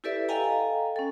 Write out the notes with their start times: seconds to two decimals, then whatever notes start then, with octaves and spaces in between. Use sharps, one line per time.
0.04 E4 G4 A4 B4 D5 E5
0.29 A4 D#5 F5 G5 G#5 A#5
0.96 C#4 A4